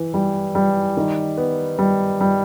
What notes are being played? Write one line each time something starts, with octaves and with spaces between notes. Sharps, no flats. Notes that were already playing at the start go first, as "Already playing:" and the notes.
Already playing: E3
G3
G3
D#3
B3
G3
G3